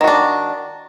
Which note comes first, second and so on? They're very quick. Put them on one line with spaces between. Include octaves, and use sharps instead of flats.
D#3 F#4 D4